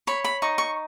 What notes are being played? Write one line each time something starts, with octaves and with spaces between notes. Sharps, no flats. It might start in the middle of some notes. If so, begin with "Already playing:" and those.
C#5 B5
B5
D#4 C#6
C#6